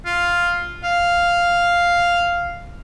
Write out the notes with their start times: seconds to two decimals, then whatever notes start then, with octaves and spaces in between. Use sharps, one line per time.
0.05 F4
0.84 F5